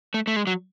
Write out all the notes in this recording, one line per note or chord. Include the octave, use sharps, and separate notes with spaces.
A3
A3
G#3
F#3